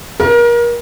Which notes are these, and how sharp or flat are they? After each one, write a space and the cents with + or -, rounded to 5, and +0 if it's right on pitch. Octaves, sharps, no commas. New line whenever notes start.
A#4 +30